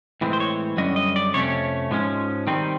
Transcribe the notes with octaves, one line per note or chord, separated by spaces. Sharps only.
A2 E3 G#3 C4
C5
C#5
F#2 D3 G3 C#4 D#5
D#5
D5
F2 C3 A3 C#4 C#5
G#2 F3 G#3 C#4
D#3 G3 C4 D#4